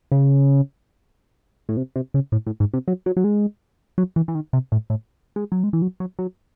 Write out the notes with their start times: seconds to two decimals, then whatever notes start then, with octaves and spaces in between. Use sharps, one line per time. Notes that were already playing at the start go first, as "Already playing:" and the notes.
0.12 C#3
1.69 A2
1.77 C3
1.96 C3
2.14 C#3
2.32 A2
2.46 A2
2.60 G#2
2.73 C3
2.88 F#3
3.06 F#3
3.17 F#3
3.24 G#3
3.98 F#3
4.16 E3
4.28 E3
4.35 D#3
4.53 C3
4.72 A2
4.90 A2
5.36 G#3
5.52 F#3
5.64 G#3
5.73 E3
5.82 F#3
6.00 F#3
6.19 F#3